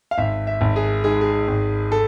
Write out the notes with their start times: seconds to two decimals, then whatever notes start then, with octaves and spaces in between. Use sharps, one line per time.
0.11 F5
0.18 G#1 E5
0.47 E5
0.61 G#1
0.76 G#4
1.04 G#2 G#4
1.21 G#4
1.48 G#1
1.92 A4